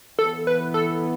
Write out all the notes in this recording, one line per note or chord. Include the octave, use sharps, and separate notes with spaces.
E3 B3 A4
B4
A4